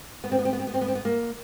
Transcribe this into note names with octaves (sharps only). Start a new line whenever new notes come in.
B3
C4
B3
C4
B3
C4
B3
C4
B3
C4
B3
A#3